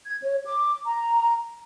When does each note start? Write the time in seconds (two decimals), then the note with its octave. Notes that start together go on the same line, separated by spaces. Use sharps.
0.06 G#6
0.22 C#5
0.45 D6
0.86 A#5